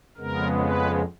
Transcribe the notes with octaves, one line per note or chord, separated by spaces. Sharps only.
F2 C#3 G#3 B3 A#4
B4